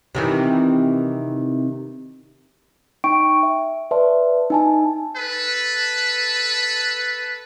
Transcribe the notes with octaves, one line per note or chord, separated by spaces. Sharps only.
C3 D#3 E3
D#4 G5 C#6 D7
E5
B4 D5 E5 A5 C6
D#4 G#5 A5
A4 B4